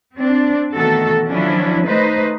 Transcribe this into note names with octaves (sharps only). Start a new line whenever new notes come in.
C4 D4
B2 D#3 E3 A3 F#4 A4
D#3 F3 F#3 C#4 D4 E4
A3 D#4 B4 C5 D#5